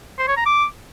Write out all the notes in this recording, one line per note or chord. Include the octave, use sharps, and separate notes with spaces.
C5
C#5
A#5
D6